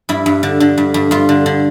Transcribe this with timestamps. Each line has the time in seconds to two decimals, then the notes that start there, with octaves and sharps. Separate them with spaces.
0.09 G2 E4
0.26 G2
0.43 D3
0.60 D3
0.78 G2
0.94 G2
1.11 G2 F4
1.29 D3
1.46 D3